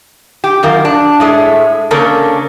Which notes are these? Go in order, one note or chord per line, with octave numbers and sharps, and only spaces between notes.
G4
F#2 D#3 F4 A#4
D4
A2 G#3 A3
C#3 A#3 C#4 D4 A4 A#4